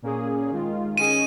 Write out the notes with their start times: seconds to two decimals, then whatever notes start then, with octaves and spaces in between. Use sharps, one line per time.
0.02 A#2 A#3 C#4 G#4
0.50 D#2 D#3 G#3 F4
0.97 D#3 C#4 G#4 D#5 D#7